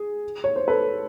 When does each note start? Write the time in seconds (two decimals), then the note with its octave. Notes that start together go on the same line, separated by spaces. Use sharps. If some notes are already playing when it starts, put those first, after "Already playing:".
Already playing: G#4
0.44 C#5
0.56 C5
0.68 A4 B4